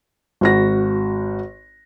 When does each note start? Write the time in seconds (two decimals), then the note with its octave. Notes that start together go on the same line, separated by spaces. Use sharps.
0.41 G#1 F#4 A#6